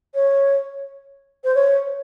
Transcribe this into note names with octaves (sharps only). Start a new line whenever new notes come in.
C#5
C5
C#5